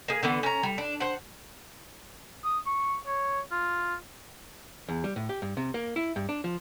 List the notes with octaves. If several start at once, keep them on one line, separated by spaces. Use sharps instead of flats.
A#3 G#4
D3 E3 B3
C#4 A#5
G3
D4
C5 F#5
D#6
C#6
C#5
F4
E2
G3
A2
G4
G2
C3
A#3
E4
G2
D4
F3